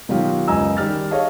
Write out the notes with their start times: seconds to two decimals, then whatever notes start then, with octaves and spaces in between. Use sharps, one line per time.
0.09 B2 D#3 F#3 F4 G4
0.48 C#2 F#2 D#5 G#5 A#5 E6
0.77 D#3 G3 G4 F6 A6
1.11 G#4 C#5 D#5 F5 A5